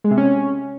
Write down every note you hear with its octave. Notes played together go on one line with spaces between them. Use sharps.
G#3
C3
C#4